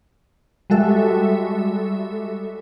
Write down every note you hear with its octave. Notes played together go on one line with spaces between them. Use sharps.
G3 G#3 F#4 A4 E5